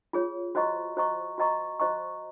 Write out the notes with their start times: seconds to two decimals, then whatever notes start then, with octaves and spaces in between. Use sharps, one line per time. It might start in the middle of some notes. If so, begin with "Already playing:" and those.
0.13 F4 G#4 C#5
0.55 F#4 C5 D#5 A#5 C#6
0.97 F#4 C5 D#5 A#5 C#6
1.38 F#4 C5 D#5 A#5 C#6
1.80 F#4 C5 D#5 A#5 C#6